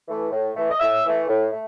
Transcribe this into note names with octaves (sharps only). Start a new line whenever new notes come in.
E3 A3
A2
E3 A3
D#5
A2 E5
E3 A3
A2
A3